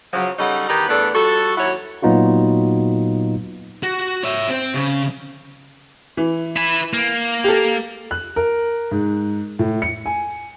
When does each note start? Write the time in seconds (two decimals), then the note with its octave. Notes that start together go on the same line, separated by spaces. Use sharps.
0.13 C#3 F3 F#3
0.39 C#3 G3 C#4 D#4 A4 F#5
0.68 E2 D#3 D#4 G4 B4
0.89 E2 A3 B3 D4 A4 D5
1.15 F3 G3 F#4 A4
1.57 D#2 F#3 E4 F#4 C#5
2.02 A#2 F#3 B3 D#4 F4 F#4
3.83 F#4
4.23 C#5 E5
4.48 C4
4.75 C#3
6.17 E3
6.56 E4 B4
6.93 A#3
7.44 G4 A4
8.11 F#6
8.36 A#4
8.91 G#2
9.59 A2
9.82 C#7
10.06 G#5